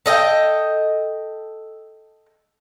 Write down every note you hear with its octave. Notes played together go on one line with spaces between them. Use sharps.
A4 D#5 E5 G5